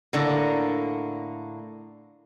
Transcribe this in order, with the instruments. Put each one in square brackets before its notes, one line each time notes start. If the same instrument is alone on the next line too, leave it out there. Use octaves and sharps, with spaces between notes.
[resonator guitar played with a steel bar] A2 D3 A#3